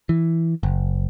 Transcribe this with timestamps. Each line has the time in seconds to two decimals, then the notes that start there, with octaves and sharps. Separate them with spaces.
0.09 E3
0.63 F#1